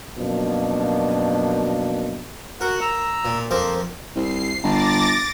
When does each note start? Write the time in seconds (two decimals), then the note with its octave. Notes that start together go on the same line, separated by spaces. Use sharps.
0.17 F#2 B2 F3 A#3 D4
2.61 F#4 A#4 F#5
2.81 A#5 E6
3.25 A#2
3.51 F2 A#3 A#4 C5
4.16 C2 C7
4.63 G1 D6 A6 A#6